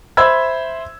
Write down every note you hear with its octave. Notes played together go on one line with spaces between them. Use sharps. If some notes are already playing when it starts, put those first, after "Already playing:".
C5 E5 B5 E6 G#6